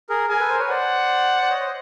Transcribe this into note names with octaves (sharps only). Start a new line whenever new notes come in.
G#4 A#4
G#4 A#4 G#5
A4 B4
A#4 C5
B4 C#5
C5 D5 F#5
D5
C#5 D#5
C5